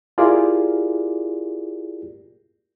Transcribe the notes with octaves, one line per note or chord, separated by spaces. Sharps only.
E4 F4 G4 G#4 A#4 D5